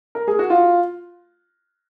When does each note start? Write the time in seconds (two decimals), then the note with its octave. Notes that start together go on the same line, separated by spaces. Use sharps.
0.15 A#4
0.28 G#4
0.39 F#4
0.50 F4